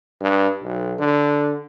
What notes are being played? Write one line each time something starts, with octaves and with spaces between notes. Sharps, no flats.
G2
B1
D3